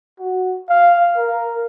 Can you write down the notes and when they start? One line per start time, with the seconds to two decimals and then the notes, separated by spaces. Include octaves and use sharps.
0.19 F#4
0.69 F5
1.17 A#4